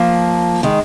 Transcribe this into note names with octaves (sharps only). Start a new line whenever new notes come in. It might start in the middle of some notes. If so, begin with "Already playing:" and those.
Already playing: F3 A#3
D#3 G#3